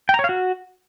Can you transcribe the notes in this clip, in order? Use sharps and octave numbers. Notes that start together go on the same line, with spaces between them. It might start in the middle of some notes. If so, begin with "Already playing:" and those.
G5
A#5
C#5
F5
F#4